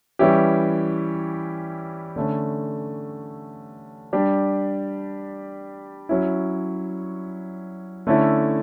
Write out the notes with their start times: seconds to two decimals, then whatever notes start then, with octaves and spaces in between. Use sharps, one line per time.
0.19 E3 G3 C#4 E4 G4
2.16 D3 A3 C#4
4.13 G3 D4 G4
6.09 F#3 C#4 E4
8.07 D3 A3 C#4 E4